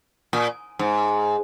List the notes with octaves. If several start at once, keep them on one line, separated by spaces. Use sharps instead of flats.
A#2
G#2